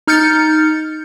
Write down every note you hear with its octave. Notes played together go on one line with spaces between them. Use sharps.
D#4 F6 G6 A6 C#7